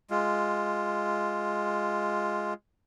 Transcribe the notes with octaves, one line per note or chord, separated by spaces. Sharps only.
G#3 F4